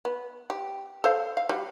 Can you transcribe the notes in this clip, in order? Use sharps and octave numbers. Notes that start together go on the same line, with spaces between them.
B3
G4
A4 C5 F5
F5
G3 F#4